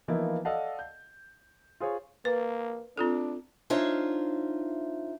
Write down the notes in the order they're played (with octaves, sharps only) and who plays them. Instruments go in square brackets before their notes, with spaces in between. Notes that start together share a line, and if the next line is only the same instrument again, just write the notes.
[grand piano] E3 F3 A#3 B3 D#4 E4
A4 D5 D#5 F5 F#5 A5
G6
F4 G#4 C5 C#5
[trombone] A#3 [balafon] B4
[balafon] C4 F4 A4 [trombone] D4
[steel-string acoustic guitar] D4 D#4 F4 C5 C#5 E5